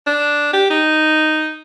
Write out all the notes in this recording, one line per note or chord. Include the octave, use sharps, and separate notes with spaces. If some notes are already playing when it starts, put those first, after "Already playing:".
D4
G4
D#4